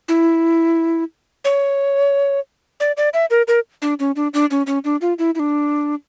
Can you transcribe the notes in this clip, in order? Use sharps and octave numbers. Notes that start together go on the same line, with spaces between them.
E4
C#5
D5
D5
E5
A#4
A#4
D4
C#4
D4
D4
C#4
C#4
D4
F4
E4
E4
D4